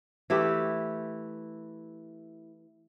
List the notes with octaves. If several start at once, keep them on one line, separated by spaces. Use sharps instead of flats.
E3 A3 E4 G4